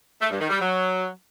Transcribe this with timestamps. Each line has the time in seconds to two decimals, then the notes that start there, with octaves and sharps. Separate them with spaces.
0.21 A3
0.30 G2
0.40 D#3
0.50 G3
0.60 F#3